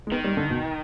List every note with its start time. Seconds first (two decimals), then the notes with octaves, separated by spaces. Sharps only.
0.07 G#3
0.12 D#3 B3
0.24 G3
0.37 D3
0.50 B2